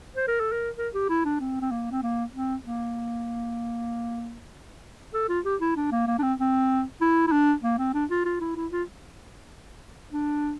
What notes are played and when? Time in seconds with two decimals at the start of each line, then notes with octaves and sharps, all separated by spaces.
0.16 C5
0.28 A#4
0.40 A4
0.52 A#4
0.78 A#4
0.94 G4
1.09 E4
1.25 D4
1.40 C4
1.61 C4
1.71 A#3
1.92 C4
2.03 A#3
2.34 C4
2.65 A#3
5.14 A4
5.29 F4
5.45 G4
5.61 E4
5.77 D4
5.92 A#3
6.08 A#3
6.19 D4
6.23 C4
6.39 C4
7.01 E4
7.27 E4
7.32 D4
7.63 A#3
7.79 C4
7.94 D4
8.10 F4
8.25 F4
8.41 E4
8.56 E4
8.72 F4
10.12 D4